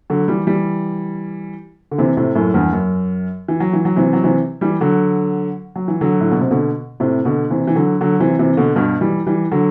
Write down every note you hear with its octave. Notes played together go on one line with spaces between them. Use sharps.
D3 F#3
E3 G3
E3 G3
D3
C3 E3
A2 C3
F#2 A2
E2 G2
F#2
E3
F#3
E3
F#3
C3 E3
F#3
C3 E3
E3 G3
D3 F#3
F#3
E3
D3 F#3
A2
B2
C3
B2 D3
A2 C3
B2 D3
C3 E3
E3
D3 F#3
D3 F#3
C3 E3
C3 E3
B2 D3
G2 B2
E3 G3
E3 G3
D3 F#3